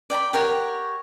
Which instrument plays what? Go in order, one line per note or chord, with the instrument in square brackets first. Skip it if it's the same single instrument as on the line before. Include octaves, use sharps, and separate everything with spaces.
[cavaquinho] D5 G5 A#5 B5
G4 A#4 C#5 F#5